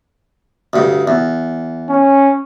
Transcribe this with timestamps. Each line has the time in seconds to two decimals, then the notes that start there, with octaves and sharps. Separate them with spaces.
0.73 D2 G2
1.08 E2
1.89 C#4